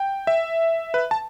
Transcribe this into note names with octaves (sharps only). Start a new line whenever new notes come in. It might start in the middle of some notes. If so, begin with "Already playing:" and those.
Already playing: G5
E5
B4
A5